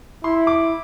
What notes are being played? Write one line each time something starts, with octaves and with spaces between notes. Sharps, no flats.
E4 C6
D6